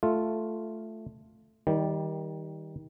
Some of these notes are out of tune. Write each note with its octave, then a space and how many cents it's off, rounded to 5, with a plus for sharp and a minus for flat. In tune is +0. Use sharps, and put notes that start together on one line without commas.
A3 +0 F4 +0
D#3 +25 G3 +0